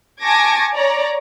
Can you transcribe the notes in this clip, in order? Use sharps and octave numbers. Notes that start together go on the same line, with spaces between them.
G#5 A5 C#6 D6 G#6 A#6
C#5 D5 A#5